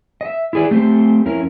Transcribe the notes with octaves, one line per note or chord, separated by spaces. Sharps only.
D#5 E5
E4 G#4 D5
A3 C4 G4 C5
F2 C#4 E4 A#4